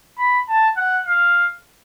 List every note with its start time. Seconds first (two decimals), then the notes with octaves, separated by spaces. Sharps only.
0.18 B5
0.48 A5
0.77 F#5
1.06 F5